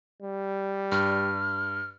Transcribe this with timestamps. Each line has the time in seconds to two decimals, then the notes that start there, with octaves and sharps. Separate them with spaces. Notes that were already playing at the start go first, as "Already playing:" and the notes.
0.22 G3
0.92 G2 F6